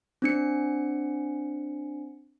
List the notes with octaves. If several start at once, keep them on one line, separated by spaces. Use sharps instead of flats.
C4 D4 C#7